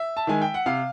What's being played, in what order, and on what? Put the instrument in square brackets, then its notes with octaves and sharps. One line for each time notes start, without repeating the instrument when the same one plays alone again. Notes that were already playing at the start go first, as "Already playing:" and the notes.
Already playing: [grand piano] E5
A5
D#3 G#3 G#5
G5
F#5
C3 F5